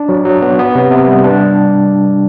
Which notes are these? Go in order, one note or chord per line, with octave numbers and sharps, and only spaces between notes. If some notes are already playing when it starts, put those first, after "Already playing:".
Already playing: D4
F#3
F#3
B3
B3
C3
C3
G3
D4